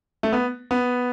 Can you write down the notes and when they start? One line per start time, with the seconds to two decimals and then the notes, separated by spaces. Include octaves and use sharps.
0.23 A3
0.32 B3
0.71 B3